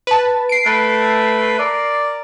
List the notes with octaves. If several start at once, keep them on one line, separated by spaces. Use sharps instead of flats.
B4 A5
C7 D7
A3 B4
A#4 D5